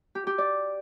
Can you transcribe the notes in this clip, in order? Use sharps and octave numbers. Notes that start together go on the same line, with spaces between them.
G4
G4
D5